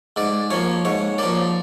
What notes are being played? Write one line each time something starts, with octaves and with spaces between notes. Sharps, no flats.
G#2 D5
F3 A#3 C#5
G#2 C#5
F3 A#3 D5